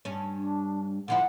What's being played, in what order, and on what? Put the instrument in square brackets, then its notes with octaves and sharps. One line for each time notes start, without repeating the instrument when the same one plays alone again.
[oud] G2 C#4
[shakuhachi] D4
[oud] D3 F3 E4 [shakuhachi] F#5